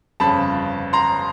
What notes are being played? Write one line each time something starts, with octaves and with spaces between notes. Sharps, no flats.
G1 F2 C#3 A5 B5
A#5 C6